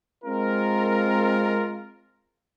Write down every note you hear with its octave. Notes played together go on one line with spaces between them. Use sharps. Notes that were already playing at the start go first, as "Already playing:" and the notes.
G#3 C4 F4 A#4